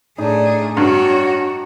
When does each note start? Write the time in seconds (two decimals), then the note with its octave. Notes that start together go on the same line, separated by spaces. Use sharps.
0.18 A2 D4 D#4 G#4
0.77 G2 F#4 C#5